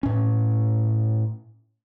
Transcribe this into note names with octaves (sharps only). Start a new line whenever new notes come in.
A2 C#4